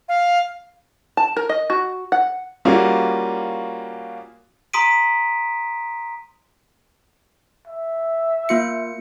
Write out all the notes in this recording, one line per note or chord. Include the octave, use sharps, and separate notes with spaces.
F5
A5
A#4
D#5
F#4
F#5
G3 A#3 C#4 F4 F#4 G#4
A#5 C6 D#6 B6 D7 D#7
E5
A#3 F4 C#7